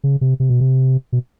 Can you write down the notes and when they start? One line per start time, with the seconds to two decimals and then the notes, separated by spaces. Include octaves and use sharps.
0.04 C#3
0.21 C3
0.40 C3
0.50 B2
0.60 C3
1.12 B2